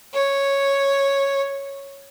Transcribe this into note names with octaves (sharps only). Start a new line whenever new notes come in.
C#5